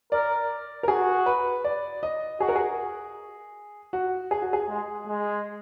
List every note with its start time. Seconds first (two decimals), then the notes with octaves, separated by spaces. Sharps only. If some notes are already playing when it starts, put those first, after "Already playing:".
0.12 A#4 D5
0.83 A#4
0.88 F#4 G#4
1.26 B4
1.64 D5
2.03 D#5
2.40 F#4 G#4
2.49 A#4
2.55 G#4
3.93 F#4
4.31 G#4
4.42 F#4
4.53 G#4
4.69 G#3
5.07 G#3